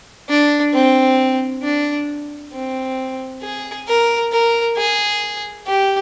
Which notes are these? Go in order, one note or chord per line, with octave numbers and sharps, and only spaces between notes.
D4
C4
D4
C4
G#4
A#4
A#4
G#4
G4